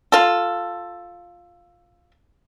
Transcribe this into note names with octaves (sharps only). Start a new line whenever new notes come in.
F4 A4